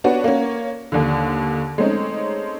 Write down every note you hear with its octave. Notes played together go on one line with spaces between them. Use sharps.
B3 D4 F#4 C#5
A#3 C#4
D#2 D3
G#3 A3 C4 C#4 D#4